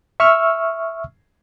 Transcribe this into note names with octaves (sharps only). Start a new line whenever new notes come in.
E5 C#6 E6 F6